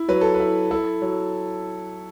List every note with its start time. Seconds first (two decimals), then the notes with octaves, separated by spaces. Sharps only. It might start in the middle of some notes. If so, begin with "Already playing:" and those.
Already playing: E4
0.09 F#3 B4
0.21 A4
0.34 B4
0.40 E4
0.71 E4 A4
1.02 F#3